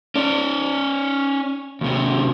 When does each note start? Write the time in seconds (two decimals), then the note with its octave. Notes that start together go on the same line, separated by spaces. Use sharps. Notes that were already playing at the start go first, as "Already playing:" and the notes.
0.16 C#4 D5
1.81 D#2 C3